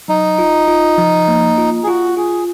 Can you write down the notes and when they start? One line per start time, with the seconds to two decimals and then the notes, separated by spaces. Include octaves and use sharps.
0.08 F#3 D#4
0.39 F4
0.68 F4
0.98 F3
1.28 A#3
1.58 F4
1.83 G#4
1.87 F4 F#4
2.17 F4 G#4